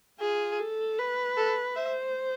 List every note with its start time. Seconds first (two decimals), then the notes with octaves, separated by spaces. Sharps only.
0.20 F4 G#4
0.59 A4
0.98 B4
1.37 A4
1.76 C5 E5